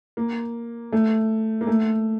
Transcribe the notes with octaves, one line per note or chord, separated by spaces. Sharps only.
A#3
A3
A#3
A3